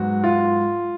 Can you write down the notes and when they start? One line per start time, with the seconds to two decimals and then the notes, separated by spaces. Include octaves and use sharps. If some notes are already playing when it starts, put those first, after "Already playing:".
Already playing: G#2 F#3 B3 F#4
0.24 F4